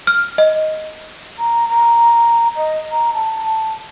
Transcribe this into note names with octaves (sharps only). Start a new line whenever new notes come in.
F6
D#5
A#5
A#5
D#5
A#5
A5